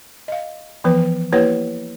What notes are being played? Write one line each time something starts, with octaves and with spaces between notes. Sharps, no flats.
D#5 F5
E3 F3 B3 B4
A#3 E4 G4 B4 C#5 F#5